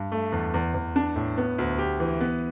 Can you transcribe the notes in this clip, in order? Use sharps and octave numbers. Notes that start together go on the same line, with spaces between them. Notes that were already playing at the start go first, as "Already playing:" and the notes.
Already playing: G2
A3
E2
E2
E2
D4
A2
B3
D2
G4
E3
B3